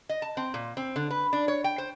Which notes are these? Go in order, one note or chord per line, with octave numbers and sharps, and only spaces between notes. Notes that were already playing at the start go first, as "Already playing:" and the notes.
D#5
A5
C4
A#2
C4
D3
B4
D4
C#5
G5
C5